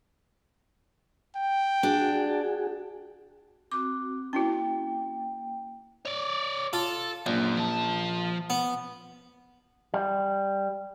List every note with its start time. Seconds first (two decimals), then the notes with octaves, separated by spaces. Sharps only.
1.36 G5
1.83 D4 F#4 G#4
3.72 C4 F#4 D6
4.33 A#3 C#4 E4 F#4 G5
6.06 C#5 D5
6.73 F4 A4
7.26 A#1 F#2
7.58 F3 A5
8.50 B3
9.94 G3